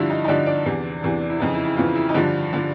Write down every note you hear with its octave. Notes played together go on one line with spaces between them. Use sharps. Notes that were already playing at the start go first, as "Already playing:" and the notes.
Already playing: G2 D3 F3 E4
D#4
D#4
G2 D3 F3 D4
D4
E2 C3 E3
E2 C3 E3
E4
F2 C#3 E3 D#4
E4
E4
F2 C#3 E3 F4
E4
D#4
G2 D3 F3 D4
D3 F3